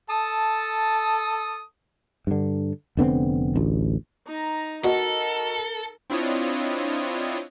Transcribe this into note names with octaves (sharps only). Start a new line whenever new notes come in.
A4 A5 D#6
G2 D3
F1 D3 B3 C4
A1 D2
D#4 A#5
F#4 A4 A#4 D#5
C4 D4 E4 F4 C#5 D#5